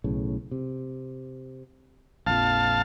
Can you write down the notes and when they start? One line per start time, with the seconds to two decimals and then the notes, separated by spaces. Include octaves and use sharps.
0.04 B1 A2 C#3
0.51 C3
2.26 A#1 F2 F5 A5